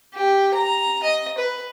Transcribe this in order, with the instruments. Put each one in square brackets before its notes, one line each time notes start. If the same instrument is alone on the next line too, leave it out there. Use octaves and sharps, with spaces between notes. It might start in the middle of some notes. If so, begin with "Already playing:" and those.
[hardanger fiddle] G4
A#5
D#5
B4